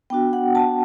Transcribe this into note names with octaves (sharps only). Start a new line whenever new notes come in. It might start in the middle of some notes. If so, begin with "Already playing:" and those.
B3 D4 F#4 G5
F#5
A5